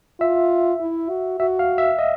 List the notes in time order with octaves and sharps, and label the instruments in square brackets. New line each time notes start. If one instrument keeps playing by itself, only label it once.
[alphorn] F4 [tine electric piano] E5
[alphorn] E4
F#4
[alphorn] F#4 [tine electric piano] E5
[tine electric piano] F5
E5
D#5